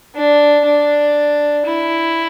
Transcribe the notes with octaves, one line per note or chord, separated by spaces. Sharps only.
D4
D4
E4